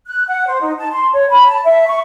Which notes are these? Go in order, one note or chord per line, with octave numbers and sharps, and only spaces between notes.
F#6
F#5
C5
D#4
A5
C6
C#5
B5
A5
E5
C#6